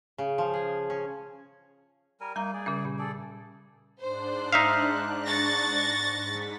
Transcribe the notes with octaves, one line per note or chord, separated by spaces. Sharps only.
C#3
F3
G#4
C#4
G3 A#4 G#5
G3 A#3 D#4 G#5 A#5
G#4 D5
C#3 G3 C#4
A#2
G#4 A4 D5
G#2 D4 C5 F#6
D#4 E5 F5
C#6 A6 A#6
G#2 B6